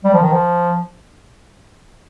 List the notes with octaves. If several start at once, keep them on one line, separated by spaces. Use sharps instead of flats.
G3
F3
D#3
F3